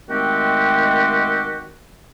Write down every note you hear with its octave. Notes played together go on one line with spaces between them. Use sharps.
D#3 G#3 A3 C4 F#4 G4